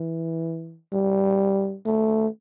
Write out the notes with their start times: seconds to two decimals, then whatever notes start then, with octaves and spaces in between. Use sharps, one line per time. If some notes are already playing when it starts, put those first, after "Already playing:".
Already playing: E3
0.93 G3
1.86 A3